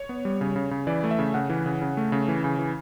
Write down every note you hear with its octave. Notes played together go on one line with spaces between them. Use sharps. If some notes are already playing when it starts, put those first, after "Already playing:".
Already playing: C#5
B3
G3
C#3
C#3
C#3
E3 D5
A3
E5
C#3
C#3 F#5
E3
C#3
C#3
A3
C#3
E3
C#3
E3